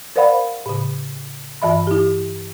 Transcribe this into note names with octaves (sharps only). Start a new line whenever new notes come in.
A#4 C5 D5 F5 F#5 B5
A2 C#3
G2 E3 E5 B5
E4 G4